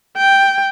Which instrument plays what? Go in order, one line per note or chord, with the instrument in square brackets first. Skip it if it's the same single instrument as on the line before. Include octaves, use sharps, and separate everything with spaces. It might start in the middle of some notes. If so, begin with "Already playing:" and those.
[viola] G5